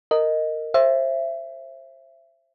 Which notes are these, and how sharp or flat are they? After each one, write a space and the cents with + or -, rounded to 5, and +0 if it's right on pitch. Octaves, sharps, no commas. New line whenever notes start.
A#4 -15 D#5 +0
C5 +25 E5 +20